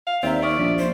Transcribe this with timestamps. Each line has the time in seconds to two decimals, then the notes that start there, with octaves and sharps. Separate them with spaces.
0.07 F5
0.23 D#2 C4 D5 E5 A#5
0.42 D5 C#6 D#6 F6
0.58 A#1
0.79 C5